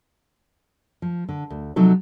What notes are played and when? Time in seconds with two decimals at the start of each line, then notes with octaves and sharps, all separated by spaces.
1.02 F3
1.29 D3
1.50 D2
1.76 C3 F3 F#3 D#4 F#4 A4